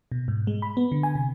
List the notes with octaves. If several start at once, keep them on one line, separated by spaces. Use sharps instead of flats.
B2
G#2
G#3
B5
B3
D3
G#5
C3